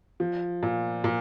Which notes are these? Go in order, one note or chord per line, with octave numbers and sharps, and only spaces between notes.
F3
A#2
A#2